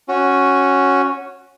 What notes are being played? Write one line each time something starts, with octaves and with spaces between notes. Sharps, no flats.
C#4 F#4